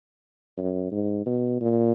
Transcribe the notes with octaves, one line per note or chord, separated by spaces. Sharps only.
F#2
G#2
B2
A#2